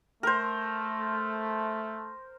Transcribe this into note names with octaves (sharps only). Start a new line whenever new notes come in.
A3 A#4 C5